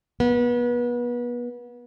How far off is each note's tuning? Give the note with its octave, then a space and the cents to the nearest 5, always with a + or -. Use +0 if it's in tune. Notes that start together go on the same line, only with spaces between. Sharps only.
B3 -30